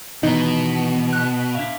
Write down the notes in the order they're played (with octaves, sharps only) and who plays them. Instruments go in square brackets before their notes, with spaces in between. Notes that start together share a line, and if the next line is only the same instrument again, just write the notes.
[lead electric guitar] B2 [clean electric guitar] D#3 E3 B3 [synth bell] D#4 D#5
[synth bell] F#6
[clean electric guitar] D4 E5 F5